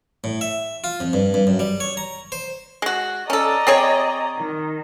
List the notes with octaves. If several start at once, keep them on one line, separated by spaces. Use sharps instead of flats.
A2
E5
F4
F2
G2
G2
F#2
G3
C#5
A#5
C5
G#3 F#4
C#4 A4 D5 D#5 A#5
C4 G#4 C#5
D#3